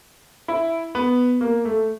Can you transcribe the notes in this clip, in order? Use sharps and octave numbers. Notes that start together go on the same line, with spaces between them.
E4
B3
A#3
A3